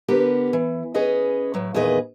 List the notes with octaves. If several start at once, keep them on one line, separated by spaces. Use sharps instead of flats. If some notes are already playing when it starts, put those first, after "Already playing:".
D3 B3 G4 A#4 B4
E3
C#4 G#4 B4 D#5
A2 F#3
E2 A#2 D#3 G#4 B4 D#5